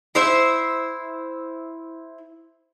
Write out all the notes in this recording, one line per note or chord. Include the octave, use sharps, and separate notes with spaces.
E4 C5 E5